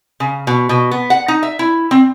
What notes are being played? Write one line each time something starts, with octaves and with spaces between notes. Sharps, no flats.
C#3
B2
B2
B3
F#5
D#4
E5
E4
C4